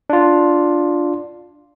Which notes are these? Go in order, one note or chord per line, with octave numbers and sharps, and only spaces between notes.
D4 F4